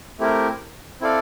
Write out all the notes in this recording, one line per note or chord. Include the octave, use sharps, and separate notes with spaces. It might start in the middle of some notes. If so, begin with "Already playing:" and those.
A3 C4 E4 G4 A#4
C4 E4 A4 D5 F5